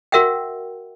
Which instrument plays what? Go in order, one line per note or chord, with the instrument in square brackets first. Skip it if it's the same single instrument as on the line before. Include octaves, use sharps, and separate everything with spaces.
[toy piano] F#4 A#4 E5 F#5 G5